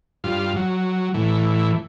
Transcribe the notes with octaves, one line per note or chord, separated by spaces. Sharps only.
G2 F4
F#3
A2 E3